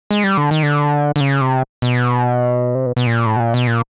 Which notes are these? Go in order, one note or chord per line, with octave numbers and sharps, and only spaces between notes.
G#3
G3
D3
D#3
D3
D3
C#3
C3
B2
C3
B2
B2
A#2
A2
B2
A#2
B2
A#2